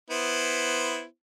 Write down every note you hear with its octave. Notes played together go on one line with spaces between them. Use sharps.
B3 E4 C5